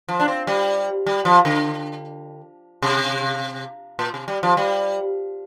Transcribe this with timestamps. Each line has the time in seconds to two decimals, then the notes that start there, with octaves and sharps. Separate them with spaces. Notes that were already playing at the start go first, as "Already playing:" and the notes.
0.09 F3
0.20 D4
0.28 C4
0.47 G3
1.06 G3
1.25 F3
1.45 D3
2.82 C3
3.99 A#2
4.14 C3
4.28 G3
4.43 F3
4.57 G3